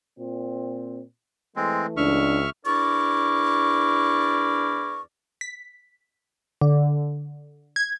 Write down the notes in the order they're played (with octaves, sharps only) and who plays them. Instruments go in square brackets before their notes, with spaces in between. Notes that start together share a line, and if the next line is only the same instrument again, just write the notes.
[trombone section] A#2 C4
[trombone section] E3 A3 [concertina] G#3 C4
[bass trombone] C#2 [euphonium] D4 [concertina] E5 C#6 F6
[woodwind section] E2 D4 E4 A#4 D5 C#6
[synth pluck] B6
D3
G#6